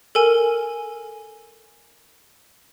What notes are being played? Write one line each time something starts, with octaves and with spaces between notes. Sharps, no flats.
A4 A#4 G#5